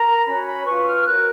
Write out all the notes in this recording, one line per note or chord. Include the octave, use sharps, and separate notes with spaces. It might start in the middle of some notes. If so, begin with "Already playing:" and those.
Already playing: A#4 A#5
C#4 F#4 C#5 B5
B5
C#4 F4 B4 C#6
F6
F#4 A#4 C#5 F#6